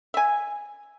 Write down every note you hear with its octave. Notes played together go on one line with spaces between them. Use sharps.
E5 G#5